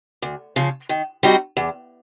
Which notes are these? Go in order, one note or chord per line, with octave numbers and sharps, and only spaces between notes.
D2
C#3 F3
D#3
G3 C4 D#4 F#4
E2